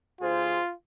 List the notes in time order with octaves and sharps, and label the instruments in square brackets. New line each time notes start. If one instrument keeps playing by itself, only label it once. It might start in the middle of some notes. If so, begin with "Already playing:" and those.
[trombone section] D2 G#4 C5 [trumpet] F4